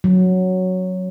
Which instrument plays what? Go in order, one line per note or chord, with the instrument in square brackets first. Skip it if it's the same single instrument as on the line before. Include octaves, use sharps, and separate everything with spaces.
[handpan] F#3